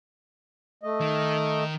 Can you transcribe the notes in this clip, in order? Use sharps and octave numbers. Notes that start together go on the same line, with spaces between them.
A3 D#5
D#3